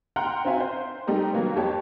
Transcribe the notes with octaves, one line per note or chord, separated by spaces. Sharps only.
F#5 G5 A#5 C6 F6 F#6
C4 C#4 F4 F#4 E5 G#5
C5
G3 A3 D#4 G4 A#4
D#3 F#3 G3 A#3 B3 D#4
F2 G3 G4 C#5 A5